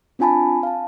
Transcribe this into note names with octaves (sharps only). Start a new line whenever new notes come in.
C4 D4 F4 G#5 A5 B5
F5 A5